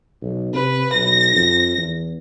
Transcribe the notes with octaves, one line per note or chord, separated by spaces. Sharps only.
B1
C3 B4
B1 A#6
F2
E2